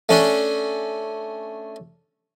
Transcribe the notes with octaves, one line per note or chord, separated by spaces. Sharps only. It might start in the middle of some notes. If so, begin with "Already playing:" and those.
A3 C#4 D4